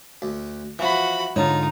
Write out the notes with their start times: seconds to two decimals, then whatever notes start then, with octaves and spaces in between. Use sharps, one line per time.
0.22 D2
0.79 E3 F3 F#4 B5
1.36 G#2 D3 D#4 F4 C#5